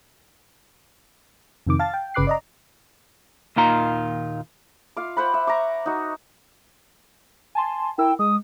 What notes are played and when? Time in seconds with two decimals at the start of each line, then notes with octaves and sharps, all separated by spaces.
1.67 F2 C3 D#3 D6
1.79 F5 A5 A6
1.94 G5
2.14 G1 C#3 B4 D6 F#6 C7
2.27 D5 D#5 A#5
3.56 D#2 A#2 D#3 F4 A#5
4.97 F4 F5 D6
5.17 C5 F#5 B5
5.34 E5
5.47 A#5 C#6 D6
5.86 D#4 F#4
7.55 G#5 A5 C6
7.98 E4 A#4 G5 E6
8.19 G#3 D#6